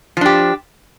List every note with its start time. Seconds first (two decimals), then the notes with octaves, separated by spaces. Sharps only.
0.17 F3
0.21 D4
0.26 G4